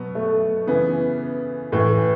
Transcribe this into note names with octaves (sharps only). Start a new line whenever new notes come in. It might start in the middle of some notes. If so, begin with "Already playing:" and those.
Already playing: B2 F#3 B3
A3
C#3 E3 B3
A2 E3